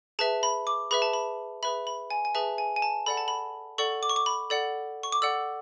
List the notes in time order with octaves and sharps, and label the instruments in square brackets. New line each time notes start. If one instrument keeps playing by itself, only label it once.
[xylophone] G#4 B4 E5 A5
B5
D6
G#4 B4 E5 B5
A5
B5
G#4 B4 E5 B5
B5
G#5
G#5
G#4 B4 E5 A5
G#5
G#5
A5
A4 D5 F#5 B5
A5
B5
A4 D5 F#5 C#6
D6
C#6
D6
B5
A4 D5 F#5
C#6
D6
A4 D5 F#5 E6